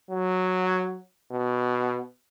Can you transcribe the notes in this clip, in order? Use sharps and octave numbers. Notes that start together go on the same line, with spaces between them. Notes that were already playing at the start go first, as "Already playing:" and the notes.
F#3
B2